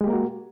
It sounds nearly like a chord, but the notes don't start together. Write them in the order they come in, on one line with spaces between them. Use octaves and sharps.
G#3 G4 A#3 A#4 F#4